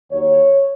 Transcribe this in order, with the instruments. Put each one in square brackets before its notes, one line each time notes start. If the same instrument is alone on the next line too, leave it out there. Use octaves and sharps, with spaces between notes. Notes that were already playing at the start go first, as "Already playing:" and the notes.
[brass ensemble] D#2 D#3 F#3 C#5